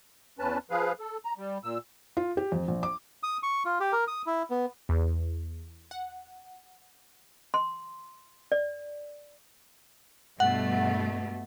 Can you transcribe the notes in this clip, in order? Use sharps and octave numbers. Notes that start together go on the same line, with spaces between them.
E2 C#4 B4 A5
F3 G#4 B4 F5
A4
A#5
G3
A#2 E6
F4
G4
F2
A#1
D6
D#6
C#6
F4
G4
A#4
D#6
E4
B3
E2
F#5
C6
D5
G2 B2 A3 F#5